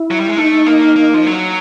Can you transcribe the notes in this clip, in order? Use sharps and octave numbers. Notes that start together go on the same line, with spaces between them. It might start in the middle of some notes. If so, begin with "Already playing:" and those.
Already playing: E4
F#3
G3
G#3
A3 D#4
A#3
A#3
F3
F#3